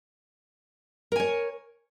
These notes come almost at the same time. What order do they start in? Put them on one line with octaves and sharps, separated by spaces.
A#4 G#5 C#5